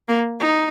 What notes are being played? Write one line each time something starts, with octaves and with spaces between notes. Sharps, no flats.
A#3
D#4